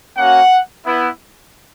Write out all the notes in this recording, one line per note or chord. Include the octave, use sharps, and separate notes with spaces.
A#3 C#4 F#4 F#5
B3 E4